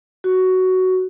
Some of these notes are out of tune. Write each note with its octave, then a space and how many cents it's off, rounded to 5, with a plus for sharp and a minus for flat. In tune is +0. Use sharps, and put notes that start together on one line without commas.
F#4 +10